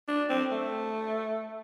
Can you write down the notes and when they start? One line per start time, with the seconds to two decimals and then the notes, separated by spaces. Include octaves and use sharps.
0.08 D4
0.30 C4
0.52 A3